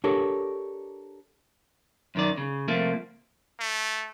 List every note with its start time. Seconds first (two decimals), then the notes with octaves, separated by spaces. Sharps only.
0.04 D4 G4 A4 A#4 C#5
2.15 F#2 D#3 D5
2.37 C#3
2.68 C2 F3 A3 A#3
3.59 A3